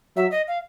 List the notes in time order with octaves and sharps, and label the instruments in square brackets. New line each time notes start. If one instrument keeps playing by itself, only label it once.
[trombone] F#3 [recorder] E5
[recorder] D#5
F5